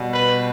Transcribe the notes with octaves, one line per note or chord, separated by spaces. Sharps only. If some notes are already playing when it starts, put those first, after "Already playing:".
Already playing: B2 G3
B4